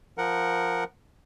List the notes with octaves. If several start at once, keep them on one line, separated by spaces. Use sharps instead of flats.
F3 A#4 F#5